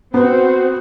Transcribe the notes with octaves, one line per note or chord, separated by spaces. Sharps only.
B3 C4 F#4 C5